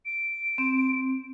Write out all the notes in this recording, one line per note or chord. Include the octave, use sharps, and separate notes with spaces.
D7
C4